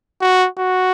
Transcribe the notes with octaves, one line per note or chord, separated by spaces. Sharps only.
F#4
F#4